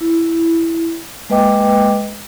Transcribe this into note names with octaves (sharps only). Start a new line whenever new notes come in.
E4
G#3 A#3 B4 D#5 G5 D6